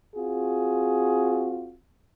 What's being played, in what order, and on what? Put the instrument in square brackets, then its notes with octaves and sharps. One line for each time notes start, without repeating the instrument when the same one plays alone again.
[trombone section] C4 F4 F#4 G#4